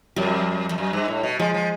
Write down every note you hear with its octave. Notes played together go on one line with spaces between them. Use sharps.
F2 G3
F2
F#2
G2
A2
B2
F3 G#3
F3